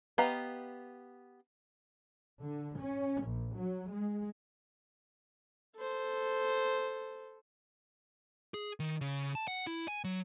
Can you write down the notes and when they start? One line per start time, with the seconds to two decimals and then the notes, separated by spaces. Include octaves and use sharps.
0.18 B3 G4 D#5 F5 A#5
2.42 D3
2.79 C#4
3.25 A#1
3.55 F#3
3.91 G#3
5.76 A4 C5
8.54 G#4
8.80 D#3
9.01 C#3
9.35 A5
9.48 F#5
9.67 E4
9.88 G#5
10.04 F#3